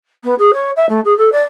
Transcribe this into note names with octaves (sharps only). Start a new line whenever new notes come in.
B3
G#4
C#5
E5
A3
G#4
A4
D5